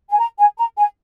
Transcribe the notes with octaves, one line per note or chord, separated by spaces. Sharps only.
G#5
A#5
G#5
A#5
G#5